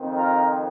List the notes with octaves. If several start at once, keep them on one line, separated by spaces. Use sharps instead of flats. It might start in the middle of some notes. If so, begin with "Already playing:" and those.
Already playing: F2 D#3 C4
F4 A#4